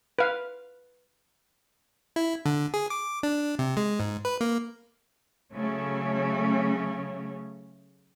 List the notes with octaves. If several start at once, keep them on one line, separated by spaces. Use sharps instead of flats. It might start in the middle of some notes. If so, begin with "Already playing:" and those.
B4 F5
E4
D3
G#4
D6
D4
C3
G#3
G#2
B4
A#3
C#3 F#3 A3 C#4